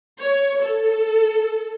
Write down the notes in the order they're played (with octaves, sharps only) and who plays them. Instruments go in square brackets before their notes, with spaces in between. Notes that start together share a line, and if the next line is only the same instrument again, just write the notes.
[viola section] C#5
A4